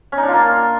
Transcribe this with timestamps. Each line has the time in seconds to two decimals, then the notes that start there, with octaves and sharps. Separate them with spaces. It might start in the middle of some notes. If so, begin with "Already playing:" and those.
0.12 C#4
0.18 D#4
0.23 D4
0.28 F4
0.33 A#3